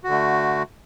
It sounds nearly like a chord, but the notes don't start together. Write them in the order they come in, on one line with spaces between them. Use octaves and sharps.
F#4 D3 A3